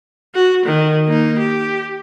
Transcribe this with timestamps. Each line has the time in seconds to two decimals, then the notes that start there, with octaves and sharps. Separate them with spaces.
0.35 F#4
0.66 D#3
1.06 A#3 D#4
1.39 G4